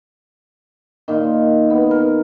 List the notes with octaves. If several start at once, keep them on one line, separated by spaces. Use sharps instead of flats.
A#2 D#3
B3
A#4